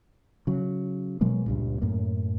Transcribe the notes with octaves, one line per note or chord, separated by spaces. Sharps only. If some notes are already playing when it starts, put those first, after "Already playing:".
C#3 F#3
B2 F#3 G#3 A#3
C#2 G2 A#2
F#2 A2 A#3